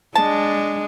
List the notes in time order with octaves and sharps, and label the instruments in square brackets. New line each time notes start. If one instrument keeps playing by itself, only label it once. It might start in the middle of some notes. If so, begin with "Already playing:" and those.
[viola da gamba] G#3 D4 [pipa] A5